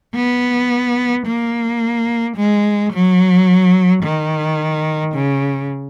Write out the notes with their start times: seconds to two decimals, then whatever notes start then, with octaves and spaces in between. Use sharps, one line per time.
0.15 B3
1.27 A#3
2.37 G#3
2.93 F#3
4.04 D#3
5.15 C#3